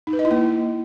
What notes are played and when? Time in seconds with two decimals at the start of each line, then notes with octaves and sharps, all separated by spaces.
0.07 D#4
0.13 B4
0.19 D#5
0.25 E4
0.31 A#3